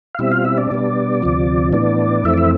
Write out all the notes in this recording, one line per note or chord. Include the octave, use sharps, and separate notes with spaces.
F5
B2 G3 C4 E4 E5
F4 F5
E4 E5
D4 D5
B2 G3 B3 D4
D2 C3 F3
A2 E3 B3 D4 D5
F2 E3 A3 C4 E4 E5
D5
E4 E5